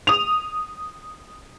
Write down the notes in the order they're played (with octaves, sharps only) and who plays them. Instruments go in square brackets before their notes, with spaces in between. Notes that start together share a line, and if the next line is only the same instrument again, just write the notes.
[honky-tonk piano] D#6 F7